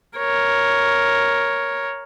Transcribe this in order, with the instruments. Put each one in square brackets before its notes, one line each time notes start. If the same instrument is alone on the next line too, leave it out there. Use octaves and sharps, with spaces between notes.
[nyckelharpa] A#4 C#5